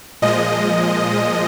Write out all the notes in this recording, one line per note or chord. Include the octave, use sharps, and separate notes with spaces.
A#2 F3 G#3 D#5